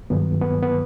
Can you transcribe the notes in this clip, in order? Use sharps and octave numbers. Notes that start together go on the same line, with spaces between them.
G2 D#3 F#3 B3
B3
B3